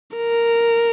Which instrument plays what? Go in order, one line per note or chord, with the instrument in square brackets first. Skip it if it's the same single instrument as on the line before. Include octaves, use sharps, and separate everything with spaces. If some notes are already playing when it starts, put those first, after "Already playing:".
[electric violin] A#4